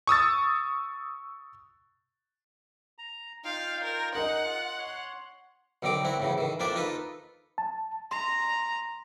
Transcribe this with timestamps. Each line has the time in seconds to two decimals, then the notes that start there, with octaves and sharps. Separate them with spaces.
0.07 C#6 D#6 E6 A6
2.98 A#5
3.45 D#4 F4 F5 G5
3.84 A#4
4.15 D#4 G#4 A#4 D#5 F#5
4.44 F4
4.78 C#5 C6
5.82 B1 D3 D#3 C4 D6
6.05 C4 E4 F#4
6.20 A2 C#3 E3
6.38 D#3 E3
6.60 F2 A#3 D4 C5 D5 E5
6.76 D#4 F4 A4 B4
7.58 A5
8.11 A#5 C6